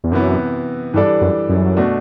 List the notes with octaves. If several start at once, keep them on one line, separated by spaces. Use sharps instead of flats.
E2
F#2 C3 E3 B3 E4
G2 E3 G3 D4 A4 D5
F#2
F#2
B2 A3 D4 F#4